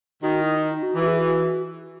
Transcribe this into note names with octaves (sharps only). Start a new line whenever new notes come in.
D#3 F#4
E4
D#4
F#4
E3
F#4
G#4
F#4